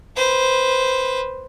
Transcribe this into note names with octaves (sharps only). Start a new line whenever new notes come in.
B4 C5